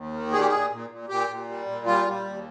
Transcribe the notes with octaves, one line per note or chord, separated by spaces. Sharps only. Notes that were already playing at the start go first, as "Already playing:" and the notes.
Already playing: D#2
D#3
A#2 G#4
G4
A#2 G#4
A#2
A#2
A#2 G4
A#2
G3
A#2
G3 F4
G3
D#2